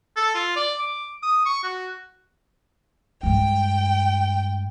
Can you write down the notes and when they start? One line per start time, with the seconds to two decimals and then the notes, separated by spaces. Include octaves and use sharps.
0.16 A4
0.35 F4
0.56 D5
0.79 D6
1.23 D#6
1.45 C#6
1.64 F#4
3.23 G2 G#3 G5